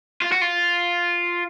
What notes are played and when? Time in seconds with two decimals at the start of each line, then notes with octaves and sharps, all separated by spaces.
0.22 F4
0.32 F#4
0.42 F4